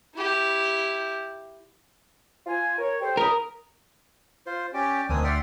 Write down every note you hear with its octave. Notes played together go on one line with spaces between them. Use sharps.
E4 G4
F4 G#5
A#4 C#5
G4 A4 C5
C#2 A#4 B5 D#6
F4 C5
C#4 G4 D5 G5
D2 B2 A#3 C4 D4 G#5 D#6
D5 E5 F#5 G5 C6 F6